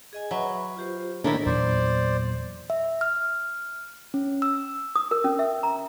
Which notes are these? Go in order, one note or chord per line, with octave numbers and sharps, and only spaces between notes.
G#4 D#5 G#5
F#3 B4 E5 B5
F4 G4 C5
A2 D#3 A#3 D4 E4 A#5
E2 A#2 F#3 C5 D5
E5
F6
C#4
E6
D#6
A#4
C#4
E5
A#5